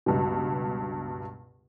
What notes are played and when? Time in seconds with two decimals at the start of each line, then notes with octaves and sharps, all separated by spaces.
0.06 C#2 G2 B2